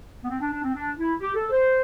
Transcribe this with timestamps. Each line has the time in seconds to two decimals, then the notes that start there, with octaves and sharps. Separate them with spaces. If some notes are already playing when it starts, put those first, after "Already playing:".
0.24 B3
0.29 C4
0.40 D4
0.51 D4
0.63 C4
0.74 D4
0.97 E4
1.20 G4
1.35 A4
1.50 C5